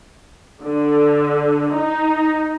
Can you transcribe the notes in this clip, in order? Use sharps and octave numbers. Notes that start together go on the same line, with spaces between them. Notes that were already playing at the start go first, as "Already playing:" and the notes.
D3
D#4